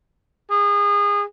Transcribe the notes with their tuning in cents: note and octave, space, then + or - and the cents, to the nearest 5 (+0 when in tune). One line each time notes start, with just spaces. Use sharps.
G#4 -30